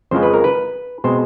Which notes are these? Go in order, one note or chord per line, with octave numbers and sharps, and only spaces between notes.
F2 C#3 F3 G#3 C5
B4
A#4
B4
B2 G#3 C4 C5